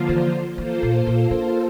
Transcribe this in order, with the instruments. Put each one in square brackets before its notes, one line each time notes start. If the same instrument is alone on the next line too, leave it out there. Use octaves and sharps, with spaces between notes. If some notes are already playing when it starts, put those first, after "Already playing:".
Already playing: [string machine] D3 F3 A#3 F4 C5
[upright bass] E3
[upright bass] E3 [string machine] A#3 F4 A4 C5
[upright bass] A#2
A#2
D3